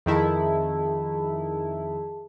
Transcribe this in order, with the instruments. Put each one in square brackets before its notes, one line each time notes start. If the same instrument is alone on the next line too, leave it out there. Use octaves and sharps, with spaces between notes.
[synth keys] F2 D#3 E4 [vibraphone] G#4 A5